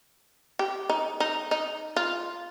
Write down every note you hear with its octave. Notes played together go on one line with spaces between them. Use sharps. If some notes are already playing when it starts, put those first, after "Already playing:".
G4
D#4
D#4
D#4
F4